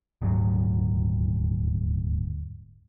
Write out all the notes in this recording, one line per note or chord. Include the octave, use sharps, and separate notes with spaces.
D#1 D2 G#2 F#3